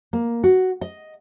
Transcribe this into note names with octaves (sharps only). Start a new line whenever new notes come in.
A#3
F#4
D#5